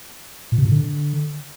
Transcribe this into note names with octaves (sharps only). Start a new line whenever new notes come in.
A#2
C3
A2
D3